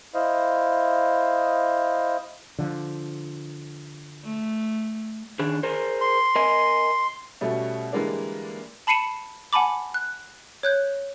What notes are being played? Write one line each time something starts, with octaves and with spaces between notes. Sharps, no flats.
E4 C5 D#5 F5
D3 F3
A3
D#3 D4 G#4
G#4 A#4 C5
C6
A#4 D#5 G#5
B2 G3 A3 C#4
D3 E3 G3 G#3 A#3 D4
A5 B5 C7 C#7 D#7 E7
F#5 G#5 A5 B5 D6
F#6
C#5 F#6 G6